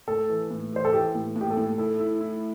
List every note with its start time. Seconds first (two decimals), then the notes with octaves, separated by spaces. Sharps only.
0.08 A3 A4
0.29 E3
0.51 A2
0.73 E3 C5
0.85 A4
0.93 E3 G4
1.15 A2
1.36 A2
1.41 G4
1.51 A4
1.57 A2
1.78 E4 A4
2.00 E4
2.21 E4